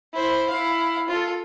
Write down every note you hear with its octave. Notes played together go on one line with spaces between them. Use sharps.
E4 C5
E4 F5
F4 A4